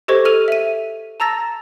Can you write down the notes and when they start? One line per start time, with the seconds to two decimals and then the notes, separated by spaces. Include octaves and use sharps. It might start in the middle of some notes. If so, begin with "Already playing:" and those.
0.08 G4 A4 C5 D#5 C#6 G#6
0.25 A4 F6 D#7 F7
0.48 E5 D#7
1.20 A5 A#5 E6 A6 A#6